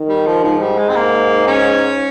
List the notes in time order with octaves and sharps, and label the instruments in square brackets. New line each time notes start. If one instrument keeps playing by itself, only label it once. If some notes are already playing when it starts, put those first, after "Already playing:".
Already playing: [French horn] D#3
[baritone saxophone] G3
F3
[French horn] G#2 [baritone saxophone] F3
[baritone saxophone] G3
G#3
C4
A#3
C#4